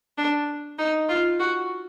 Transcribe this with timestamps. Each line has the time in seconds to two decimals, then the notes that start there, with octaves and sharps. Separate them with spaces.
0.18 D4
0.79 D#4
1.09 F4
1.40 F#4